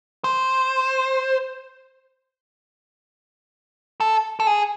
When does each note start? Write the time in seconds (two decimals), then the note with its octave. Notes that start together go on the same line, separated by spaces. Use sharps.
0.24 C5
4.00 A4
4.40 A4
4.47 G#4